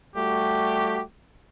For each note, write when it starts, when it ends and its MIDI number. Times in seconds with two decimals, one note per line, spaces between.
0.16 1.01 55
0.16 1.01 57
0.16 1.01 66
0.16 1.01 67